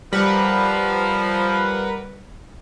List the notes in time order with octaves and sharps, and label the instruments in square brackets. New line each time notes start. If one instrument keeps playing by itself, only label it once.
[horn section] F3 [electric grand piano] G3 [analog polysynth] A#4 B4 F#5